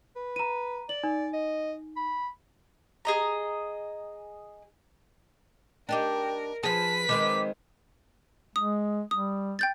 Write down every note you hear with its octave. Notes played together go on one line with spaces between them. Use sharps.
B4
A#5 D#7
D5 F#7
D#4
D#5
B5
G#4 D#5 A#5
D4 D#4 G4 A#4 G5
F3 G#4 B4 A5 B6
D#3 G#3 C4 D6
G#3 D#6
G3 D#6
G5 G6 A6